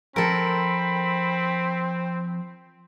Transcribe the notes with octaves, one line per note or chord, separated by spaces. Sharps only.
F3 C4 A4 A#4 B5